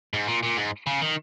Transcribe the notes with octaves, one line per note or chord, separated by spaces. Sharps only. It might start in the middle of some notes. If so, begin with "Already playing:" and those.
G#2
A#2
A#2
G#2
C#3
D#3